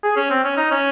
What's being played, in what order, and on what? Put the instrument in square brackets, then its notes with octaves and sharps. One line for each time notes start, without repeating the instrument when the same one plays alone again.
[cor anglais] G#4
C#4
C4
C#4
D#4
C#4